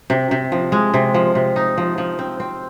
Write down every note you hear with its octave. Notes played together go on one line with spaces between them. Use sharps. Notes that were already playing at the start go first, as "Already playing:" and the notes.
C3
C3
F3
G#3
C3
F3
C3
D#4
F3
F3
C4
C4